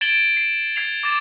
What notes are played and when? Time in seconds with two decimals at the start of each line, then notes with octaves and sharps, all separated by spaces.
0.01 G#6 A6 D7 E7 F#7 G7
0.37 C7
0.76 G#6 C7 F7
1.03 D6 A6 E7